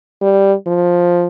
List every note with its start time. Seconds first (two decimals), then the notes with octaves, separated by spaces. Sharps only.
0.21 G3
0.67 F3